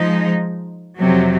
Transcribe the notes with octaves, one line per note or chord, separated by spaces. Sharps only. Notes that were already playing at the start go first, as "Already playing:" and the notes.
Already playing: F3 G#3 D#4
F2 C3 F#3